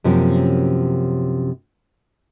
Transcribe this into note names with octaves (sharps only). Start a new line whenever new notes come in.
F#2 C3 F3 A#3 C#4